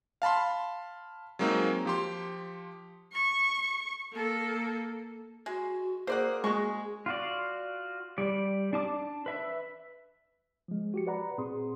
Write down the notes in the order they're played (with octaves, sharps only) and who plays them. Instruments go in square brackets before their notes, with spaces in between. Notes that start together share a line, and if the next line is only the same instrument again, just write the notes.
[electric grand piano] F5 A5 B5 C6
F#3 G#3 A#3 C4 D#4
F3 G4 C6
[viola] C#6
A#3 A4
[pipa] G#3 [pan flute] F#4
[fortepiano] A#3 [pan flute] G#4 [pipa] C5 D5 F#5
[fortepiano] G#3 [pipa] F#4 C#6
[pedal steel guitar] F4 F#4 D5
G3 D5
D4 A5 D6
B4 E5
[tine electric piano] F3 G#3
F#4 G4 C#7
B4 D5 F#5 A#5 B5
A#2 C4 G#4 C6 D#6